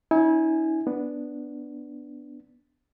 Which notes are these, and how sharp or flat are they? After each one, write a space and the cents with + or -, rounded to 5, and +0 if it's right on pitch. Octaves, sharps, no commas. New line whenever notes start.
C#4 +35 E4 -35 G#5 +0
B3 +0 D4 +0